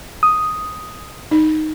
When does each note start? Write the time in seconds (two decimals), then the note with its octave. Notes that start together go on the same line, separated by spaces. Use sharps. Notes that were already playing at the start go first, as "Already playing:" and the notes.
0.23 D#6
1.31 D#4